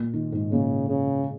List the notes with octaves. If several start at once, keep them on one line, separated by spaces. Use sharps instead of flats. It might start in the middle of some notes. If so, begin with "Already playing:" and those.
Already playing: A#2
D#3
G#2
A#2 C#3
C#3